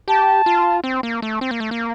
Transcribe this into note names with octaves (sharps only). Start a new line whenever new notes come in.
G4 A5
F4
C4
A#3
A3
C4
A#3
A3
A#3